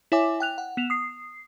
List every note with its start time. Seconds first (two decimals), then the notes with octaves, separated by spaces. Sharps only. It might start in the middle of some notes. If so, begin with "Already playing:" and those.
0.12 E4 C#5 E5 G#5 D6
0.40 G5 F#6 F7
0.58 F#5
0.77 B3 E7 F7
0.90 D#6 C7